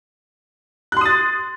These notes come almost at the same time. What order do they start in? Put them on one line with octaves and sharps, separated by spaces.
F#6 C6 D#6 A6